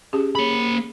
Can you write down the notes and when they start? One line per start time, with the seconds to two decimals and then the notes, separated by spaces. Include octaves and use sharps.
0.13 C#4 G4 G#4
0.35 A#3 G#4 C#5 B5